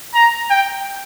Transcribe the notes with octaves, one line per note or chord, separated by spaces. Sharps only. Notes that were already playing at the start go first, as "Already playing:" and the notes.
A#5
G5